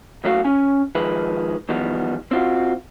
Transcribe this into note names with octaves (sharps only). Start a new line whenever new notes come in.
C#2 F#2 A3 F#4 F5
C#4 G#5
D#3 F3 G#3 B4
E2 D#3 F3 G3 B3
C4 F4 F#4